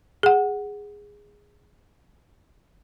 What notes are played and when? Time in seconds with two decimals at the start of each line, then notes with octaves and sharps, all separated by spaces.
0.23 G#4 F#5